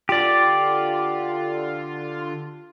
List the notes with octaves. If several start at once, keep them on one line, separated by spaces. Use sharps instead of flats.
D3 F4 G4 D5